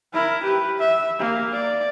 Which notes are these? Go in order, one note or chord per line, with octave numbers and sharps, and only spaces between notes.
E4 A#4
G4 B4
E5
A#3
D5